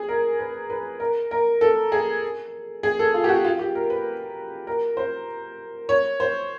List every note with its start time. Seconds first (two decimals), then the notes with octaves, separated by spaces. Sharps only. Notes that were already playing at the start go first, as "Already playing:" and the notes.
Already playing: G#4
0.08 A#4
0.39 B4
0.70 B4
1.00 A#4
1.31 A#4
1.61 A4
1.92 G#4
2.83 G#4
2.99 A4
3.14 F4
3.24 G4
3.29 F#4
3.45 F4
3.59 G4
3.75 A#4
3.90 B4
4.67 A#4
4.97 C5
5.89 C#5
6.20 C5